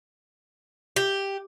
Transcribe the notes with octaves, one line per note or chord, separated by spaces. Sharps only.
G4